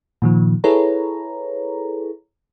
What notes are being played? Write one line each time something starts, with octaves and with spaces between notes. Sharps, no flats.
A#2 D#3 F3
E4 G#4 A4 B4 C#5 A#5